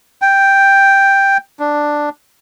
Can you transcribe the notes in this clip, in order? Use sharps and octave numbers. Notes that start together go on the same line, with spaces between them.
G5
D4